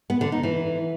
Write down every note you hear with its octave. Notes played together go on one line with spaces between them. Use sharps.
B3
D3
D#4
E3